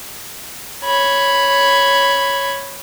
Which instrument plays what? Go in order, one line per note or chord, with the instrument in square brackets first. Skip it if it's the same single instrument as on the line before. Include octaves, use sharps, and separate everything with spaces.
[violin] C#5 B5